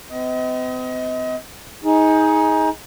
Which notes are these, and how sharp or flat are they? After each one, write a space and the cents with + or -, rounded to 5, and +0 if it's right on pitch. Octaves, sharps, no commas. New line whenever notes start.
C4 -45 D#5 +30
D#4 +20 G#4 +0